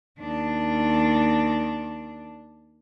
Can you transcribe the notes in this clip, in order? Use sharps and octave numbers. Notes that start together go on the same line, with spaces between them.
D#2 D4